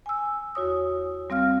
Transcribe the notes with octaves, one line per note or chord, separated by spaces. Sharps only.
G#5 E6
E2 F#4 C#5 D#6
G3 C4 F5 F6